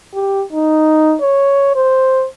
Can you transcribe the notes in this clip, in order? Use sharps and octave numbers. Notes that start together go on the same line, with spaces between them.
G4
D#4
C#5
C5